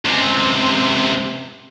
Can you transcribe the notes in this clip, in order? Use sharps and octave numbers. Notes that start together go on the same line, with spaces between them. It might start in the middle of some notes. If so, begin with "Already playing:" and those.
C#2 C3